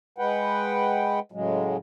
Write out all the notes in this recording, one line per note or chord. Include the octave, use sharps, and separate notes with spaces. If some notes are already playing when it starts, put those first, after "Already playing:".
G#3 B4 F#5 G5
A2 C#3 F#3 G#3